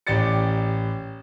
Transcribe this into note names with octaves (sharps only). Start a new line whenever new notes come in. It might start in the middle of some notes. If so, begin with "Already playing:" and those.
A1 G4 D5 A6 C#7